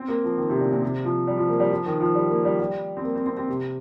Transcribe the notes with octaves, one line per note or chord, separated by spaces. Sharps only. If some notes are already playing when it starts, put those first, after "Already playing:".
Already playing: C4
A#3
F3
D#3
C3
A#2
A#2
C3
F3
G3
F3
A#3
G3
F3
D#3
F3
G3
A#3
G3
G3
C4
A#3
C4
C4
C4
C3